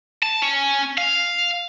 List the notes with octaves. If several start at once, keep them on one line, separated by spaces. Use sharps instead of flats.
A5
C#4
F5